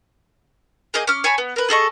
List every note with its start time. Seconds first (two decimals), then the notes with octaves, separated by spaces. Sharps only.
0.94 A#3 G#4 D#5 G6
1.07 C#4 D6 F6
1.24 C#5 G#5 A5 B5
1.38 B3
1.56 A#4 B4
1.69 G#4 A4 D#5 C#6